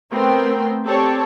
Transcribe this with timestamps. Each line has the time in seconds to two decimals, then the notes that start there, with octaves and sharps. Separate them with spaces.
0.11 A3 B3 C4 A#4 G5 C6
0.85 C4 G4 A4 C#5 D5